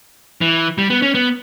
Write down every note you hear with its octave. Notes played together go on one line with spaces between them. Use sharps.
E3
G3
B3
C#4
B3